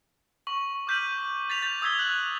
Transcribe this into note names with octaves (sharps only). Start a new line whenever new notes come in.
C#6 F#7
D6 F6 G6 B6 D#7 F#7
A6 B6 F7
G6 A6
D#6 E6 G#6 B6 G7
F#6 F#7